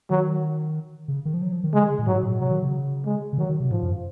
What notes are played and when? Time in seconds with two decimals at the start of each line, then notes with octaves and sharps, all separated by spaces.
0.10 D#3 F#3
1.08 C#3
1.25 D#3
1.34 F3
1.42 F#3
1.52 F3
1.64 D#3
1.73 C#3 G#3
1.82 D#3
1.90 C#3
1.99 A#2
2.06 G#2 F#3
2.23 A#2
2.40 C3 F#3
2.50 D#3
2.62 C#3
3.05 G#3
3.33 C#3
3.38 D#3 F#3
3.49 D#3
3.60 C3
3.71 G#2 F3
3.83 F#2